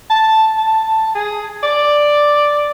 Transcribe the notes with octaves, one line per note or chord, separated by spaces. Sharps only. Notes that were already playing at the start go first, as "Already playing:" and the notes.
A5
A5
G#4
D5